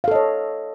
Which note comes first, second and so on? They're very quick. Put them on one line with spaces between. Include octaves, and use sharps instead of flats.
F5 A4 D#5 C#5